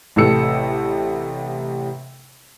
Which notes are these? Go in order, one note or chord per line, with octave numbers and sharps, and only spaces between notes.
A1 A2 C3 A4 E6 C#7